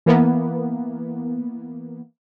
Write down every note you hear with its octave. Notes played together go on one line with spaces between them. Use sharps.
E3 A#3 B3